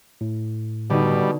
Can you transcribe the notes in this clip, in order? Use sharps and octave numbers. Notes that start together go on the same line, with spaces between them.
A2
B2 D3 G3 D#4